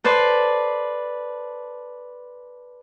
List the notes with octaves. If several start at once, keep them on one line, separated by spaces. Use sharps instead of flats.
A4 B4 C5 D5